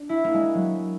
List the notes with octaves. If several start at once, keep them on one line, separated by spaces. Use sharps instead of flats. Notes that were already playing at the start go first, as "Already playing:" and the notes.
Already playing: D4
E4
A#3
G#3
F#3